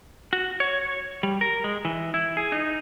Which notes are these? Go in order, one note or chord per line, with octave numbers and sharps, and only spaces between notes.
F#4
C#5
G3
A#4
G#3
E3
E4
G#4
D#4